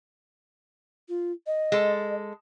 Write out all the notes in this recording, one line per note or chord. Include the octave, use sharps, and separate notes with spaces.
F4
D#5
G#3 A4